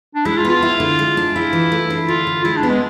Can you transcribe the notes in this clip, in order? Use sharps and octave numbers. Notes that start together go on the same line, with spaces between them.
D4
G#3 E4
F4
B3
F4
E4
D3
G#3
D4
E4 F4
E3
A3
D4
D3 F4
D3
G#3 E4
D4
B3
G#3